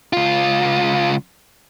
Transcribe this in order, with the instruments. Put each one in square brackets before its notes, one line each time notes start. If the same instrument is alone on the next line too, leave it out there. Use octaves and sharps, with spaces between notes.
[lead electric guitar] C#2 F4